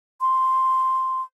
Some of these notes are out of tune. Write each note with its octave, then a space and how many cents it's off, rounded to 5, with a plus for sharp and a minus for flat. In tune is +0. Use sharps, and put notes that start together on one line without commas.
C6 +0